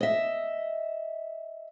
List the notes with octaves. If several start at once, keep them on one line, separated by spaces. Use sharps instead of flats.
D#5 E5